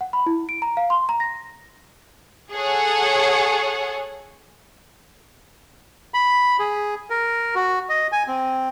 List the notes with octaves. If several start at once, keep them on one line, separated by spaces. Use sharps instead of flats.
F#5
B5
E4
D7
A#5
F5
C6
A#5
A#6
G#4 A4 C#5 F#5
B5
G#4
A#4
F#4
D#5
G#5
C4